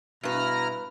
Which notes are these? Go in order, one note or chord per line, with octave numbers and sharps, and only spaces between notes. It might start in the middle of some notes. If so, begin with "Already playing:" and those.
G2 B2 E4 B4 A#5 F6